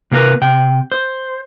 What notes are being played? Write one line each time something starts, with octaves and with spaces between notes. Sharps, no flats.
C3 A#3 F4 A#4 B4
C3 G5
C5